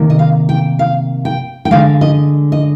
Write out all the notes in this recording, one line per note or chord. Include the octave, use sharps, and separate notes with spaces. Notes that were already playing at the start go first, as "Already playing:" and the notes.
Already playing: C3 D#3 A#3
D#5
F5
G5
F5
G5
G5
D3 G#3 F5
D#5
D#5